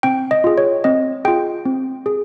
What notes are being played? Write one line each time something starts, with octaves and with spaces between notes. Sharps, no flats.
C4 G5
D#5
F4 G#4
C#5
C4 D#5
F4 G#4 G5
C4
G#4